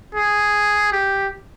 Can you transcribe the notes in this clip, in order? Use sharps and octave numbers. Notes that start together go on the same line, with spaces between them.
G#4
G4